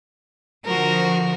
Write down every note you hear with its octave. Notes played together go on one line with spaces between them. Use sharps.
D3 F3 F#4 A#4